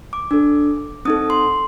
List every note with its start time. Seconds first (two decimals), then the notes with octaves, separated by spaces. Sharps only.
0.13 D6
0.31 D4 A4
1.05 C4 D#4 A4 D#6
1.30 C6